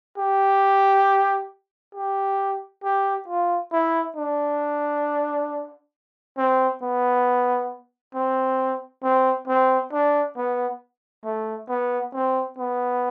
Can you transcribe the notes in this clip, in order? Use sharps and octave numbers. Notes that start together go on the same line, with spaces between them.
G4
G4
G4
F4
E4
D4
C4
B3
C4
C4
C4
D4
B3
A3
B3
C4
B3